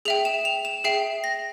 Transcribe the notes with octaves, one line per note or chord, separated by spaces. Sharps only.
G#4 E5 G5 F7
E7
F7
E7
G#4 E5 G5 C7
A#6